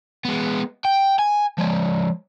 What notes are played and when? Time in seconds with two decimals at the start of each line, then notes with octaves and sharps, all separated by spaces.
0.25 G#3 B3
0.85 G5
1.19 G#5
1.58 F3 G#3